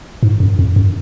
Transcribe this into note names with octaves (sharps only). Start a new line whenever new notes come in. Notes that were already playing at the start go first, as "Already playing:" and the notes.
G#2
F#2
F2
F#2